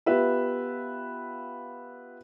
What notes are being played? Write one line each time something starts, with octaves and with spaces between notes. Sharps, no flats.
B3 F4 G4 B4 E5 B5